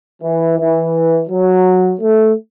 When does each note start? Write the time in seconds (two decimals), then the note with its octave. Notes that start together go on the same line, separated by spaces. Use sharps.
0.23 E3
0.58 E3
1.30 F#3
2.01 A3